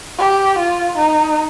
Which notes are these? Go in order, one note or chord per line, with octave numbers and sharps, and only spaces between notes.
G4
F4
D#4